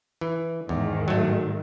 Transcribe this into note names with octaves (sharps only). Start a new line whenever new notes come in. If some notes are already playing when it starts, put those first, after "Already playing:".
E3
E2 G#2 D#3
F#3 A3